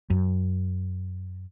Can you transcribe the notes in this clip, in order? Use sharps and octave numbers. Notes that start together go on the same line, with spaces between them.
F#2